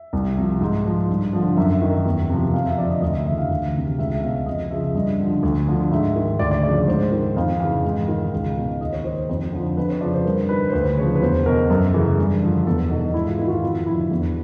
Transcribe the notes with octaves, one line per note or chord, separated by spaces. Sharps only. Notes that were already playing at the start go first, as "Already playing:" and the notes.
Already playing: E5
C2
C3 F3
G#2
F3
G2
D3 F3
F#2 E5
D#3
E2
C3 F3
F2 F5
E5
D3 F3 D5
D#5
D2 D#5
E5
C#3 E3 E5
F5
D2
C3 D#3
C#2 E5
E5
B2 F5
F2 D#5
C#3 F3 E5
G2 D#5
D3 F3
D2
D3 F3
G#2 E5
D#3
D2 D5
D5
C#3 F3 D5
C#5
G#2 C5
D#3
F2 F5
C#3 E3 F5
G#2
D#3
C#2
B2
D#2 D#5
C#5
D#3 C5
F2 C5
D3 F3
F2 B4
C#5
C#3 F3 D5
C5
G2 A#4
D#3 B4
C5
D2 B4
C#3 F3 C#5
B4
E2 C5
B2 A#4
F#2 A4
C#3 E3
G2
D3 F3
E2 A4
B2 D#4
G#2 E4
F4
D#3 E4
F#4
F4
F2 E4
D3 F3 E4
E2 F#4